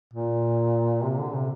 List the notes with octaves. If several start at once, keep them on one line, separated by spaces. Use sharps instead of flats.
A#2
C3
D3
C3